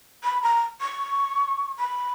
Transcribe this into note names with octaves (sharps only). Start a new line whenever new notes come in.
B5
A#5
C#6
B5